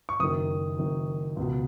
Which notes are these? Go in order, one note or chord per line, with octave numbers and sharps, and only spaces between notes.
C#6
F#1 F#2 D#3 D#6
F#1 F#2 D#3
C#2 B2